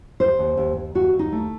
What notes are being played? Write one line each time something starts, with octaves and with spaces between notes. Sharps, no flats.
D#2 C5
D#2
D#2
D#2
D#2 F#4
D#2
D#4
A3